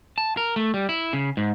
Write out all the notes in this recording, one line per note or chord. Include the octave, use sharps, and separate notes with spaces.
A5
A#4
A3
G3
E4
C#3
G#2